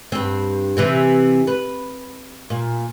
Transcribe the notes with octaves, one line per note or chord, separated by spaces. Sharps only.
G2 C4
C3 E3 C4
B4
A#2